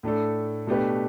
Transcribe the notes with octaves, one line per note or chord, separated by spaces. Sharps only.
A2 A3 D4 A4
B2 A3 D4 G4 B4